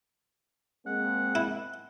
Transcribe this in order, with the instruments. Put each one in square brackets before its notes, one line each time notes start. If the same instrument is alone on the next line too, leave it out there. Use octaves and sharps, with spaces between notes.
[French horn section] G#3 A#3 C4 [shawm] F#5
[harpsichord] E4